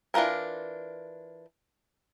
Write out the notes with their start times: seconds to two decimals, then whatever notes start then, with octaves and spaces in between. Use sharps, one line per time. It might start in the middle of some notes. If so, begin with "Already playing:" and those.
0.14 E3 D4 F4 A#4 C#5